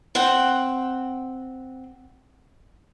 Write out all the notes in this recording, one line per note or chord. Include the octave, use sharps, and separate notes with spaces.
C4 F#5 G5